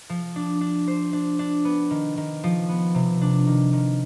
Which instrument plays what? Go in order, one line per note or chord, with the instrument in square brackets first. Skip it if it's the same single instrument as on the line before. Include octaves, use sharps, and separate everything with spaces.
[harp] F3
D4
D4
C5
D4
D4
B3
D#3
D#3
F3
B3
C3
D4
D#3
D#3